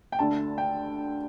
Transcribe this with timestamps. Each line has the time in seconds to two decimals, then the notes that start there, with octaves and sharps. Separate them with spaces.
0.12 G5
0.19 D2 D3 A3 A5
0.58 G5